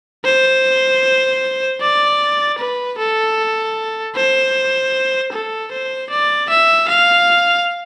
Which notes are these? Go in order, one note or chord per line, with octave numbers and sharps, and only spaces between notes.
C5
D5
B4
A4
C5
A4
C5
D5
E5
F5